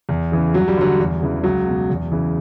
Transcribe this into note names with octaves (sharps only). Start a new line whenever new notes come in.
E2
C#3 E3
G2 F#3
G3
D3 F#3
E2
C#3 E3
C#2 F#3
B2
E2
C#3 E3